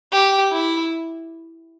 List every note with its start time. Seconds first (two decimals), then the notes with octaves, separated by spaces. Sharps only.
0.12 G4
0.52 E4